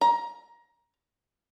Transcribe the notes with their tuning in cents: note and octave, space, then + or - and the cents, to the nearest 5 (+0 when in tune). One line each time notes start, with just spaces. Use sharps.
A#5 +20